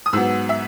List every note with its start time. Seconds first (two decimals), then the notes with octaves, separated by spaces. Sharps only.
0.06 D#6
0.13 G#2 F#3 B3 E6
0.49 E5